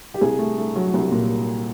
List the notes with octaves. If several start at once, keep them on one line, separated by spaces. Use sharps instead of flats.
G4
C2 G#4
A3
A3
F#3
C2
A#2